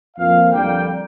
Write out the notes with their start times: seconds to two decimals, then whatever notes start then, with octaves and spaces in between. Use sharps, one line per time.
0.16 F2 F3 A#3 F5
0.51 F2 D3 G3 A#3 G5